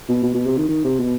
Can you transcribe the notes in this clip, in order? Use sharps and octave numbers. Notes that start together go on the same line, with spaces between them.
B2
B2
B2
C3
D#3
D#3
C3
B2